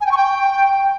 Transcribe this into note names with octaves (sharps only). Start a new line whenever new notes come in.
G#5
G5
C#6
G5